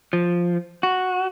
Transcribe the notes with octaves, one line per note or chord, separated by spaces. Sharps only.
F3
F#4